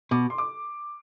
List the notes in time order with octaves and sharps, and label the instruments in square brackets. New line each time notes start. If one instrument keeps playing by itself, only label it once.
[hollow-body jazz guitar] B2 [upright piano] D6
[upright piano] C6
D6